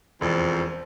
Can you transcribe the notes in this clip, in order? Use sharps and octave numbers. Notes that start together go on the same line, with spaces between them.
E1 F2 C5